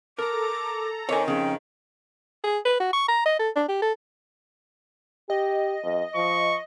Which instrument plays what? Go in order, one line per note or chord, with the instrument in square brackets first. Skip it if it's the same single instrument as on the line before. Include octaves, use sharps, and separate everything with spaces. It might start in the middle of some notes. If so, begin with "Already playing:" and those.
[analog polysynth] A4 A#5 [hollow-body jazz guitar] A#4 [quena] D6
[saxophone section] D#3 C4 [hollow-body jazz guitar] C#5 G#5 [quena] D6
[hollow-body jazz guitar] F2 C#3 [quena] G5
[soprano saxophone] G#4
B4
F#4
C#6
A#5
D#5
A4
D4
G4
A4
[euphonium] G4 [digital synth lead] D#5
[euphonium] F2
[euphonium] F3 [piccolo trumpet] C#6